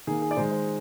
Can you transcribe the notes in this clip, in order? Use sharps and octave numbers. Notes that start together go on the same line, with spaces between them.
D#3 A#3 G#4
G#4
D5
D#3 G#3 C5
C5